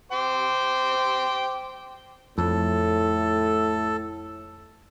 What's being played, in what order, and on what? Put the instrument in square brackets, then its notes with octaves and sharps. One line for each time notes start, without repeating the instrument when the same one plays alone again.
[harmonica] C5 G5 D6
[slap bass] F2 [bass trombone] A2 [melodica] A4